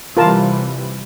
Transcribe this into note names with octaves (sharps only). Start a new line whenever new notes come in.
C3 E3 G3 F4 A#4 A5